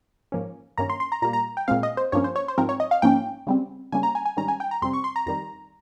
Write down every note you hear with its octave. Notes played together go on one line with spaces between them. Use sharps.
G#2 F3 A#3 C#4
G2 D#3 A#3 C#4 A#5
C6
C6
A#5
A#2 G3 A#3 A#5
A#5
G5
A#2 G#3 C4 F5
D#5
C5
G2 F3 A#3 C#4 C#5
C5
C#5
C5
G#2 F3 C4 A#4
C#5
D#5
F5
G#2 F3 A#3 C#4 G5
C#3 G3 C4
C#3 G3 A#3 C#4 G#5
A#5
G#5
G#5
G#2 D#3 G3 C#4 A#5
G#5
G5
A#5
F2 C3 G3 C4 C6
C#6
C6
A#5
F2 D#3 G3 A#5